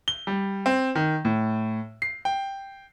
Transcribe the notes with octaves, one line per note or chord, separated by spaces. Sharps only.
G7
G3
C4
D#3
A2
C7
G5